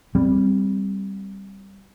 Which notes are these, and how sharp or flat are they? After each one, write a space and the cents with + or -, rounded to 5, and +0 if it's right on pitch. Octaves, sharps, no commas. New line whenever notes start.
G3 +0 C4 +0